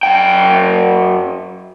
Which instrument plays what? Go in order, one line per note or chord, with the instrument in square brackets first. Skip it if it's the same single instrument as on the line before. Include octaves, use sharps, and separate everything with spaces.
[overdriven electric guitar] F#2 G5